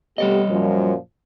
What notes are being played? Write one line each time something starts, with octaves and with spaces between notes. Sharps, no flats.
G3 A3 B3 G4 C#5 D#5
F#2 A#2 F3